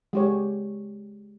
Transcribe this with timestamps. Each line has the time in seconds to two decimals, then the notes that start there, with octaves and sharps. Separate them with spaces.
0.13 G#3 G4 C#5